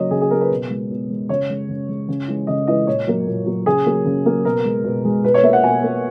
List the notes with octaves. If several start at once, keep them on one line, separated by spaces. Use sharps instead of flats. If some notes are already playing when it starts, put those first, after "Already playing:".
Already playing: C#3 F#3 A#3 C#5 D#5
C#3 G#4
G#4
F#3 A#3 A#4
B4
B2
G#3
B2
G#3
C#3 C#5
G#3
C#3
G#3
C#3
E3 G#3
C#3 D#5
E3 G#3 D#5
A#2 C#5
F#3 A#3
A#2
F#3 A#3
C#3 G#4
F#3 A#3
C#3
F#3 A#3
B2 A#4
G#3
B2
G#3
B2 B4
C#5
A#3 E5
F#5
B2 G#5
A#3